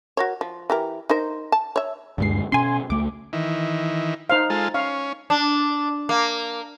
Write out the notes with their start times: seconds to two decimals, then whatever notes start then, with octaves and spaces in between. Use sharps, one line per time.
0.17 F#4 A#4 C#5
0.41 F3
0.70 E3 G4 A#4
1.10 D#4 A#4 C5
1.52 A5
1.76 C#5 E5
2.18 D#1 D2 G2 G#3 C7
2.52 B2 C#4 G#5 C6
2.90 C#2 A3 D6
3.33 D#3 E3
4.30 D#4 C5 F5
4.50 G#3 F4 A4
4.74 C#4 F5
5.30 D4
6.09 A#3